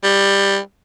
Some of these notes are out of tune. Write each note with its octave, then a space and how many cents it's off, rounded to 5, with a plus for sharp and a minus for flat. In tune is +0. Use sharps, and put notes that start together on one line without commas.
G3 +15